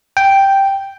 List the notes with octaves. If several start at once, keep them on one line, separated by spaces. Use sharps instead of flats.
G5